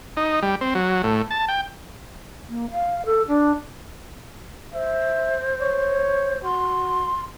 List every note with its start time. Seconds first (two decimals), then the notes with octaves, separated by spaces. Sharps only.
0.17 D#4
0.42 G3
0.61 C4
0.75 F#3
1.03 A2
1.31 A5
1.48 G5
2.49 A#3
2.71 F5
3.05 A4
3.28 D4
4.74 C5 E5
5.61 C#5
6.44 F#4 C6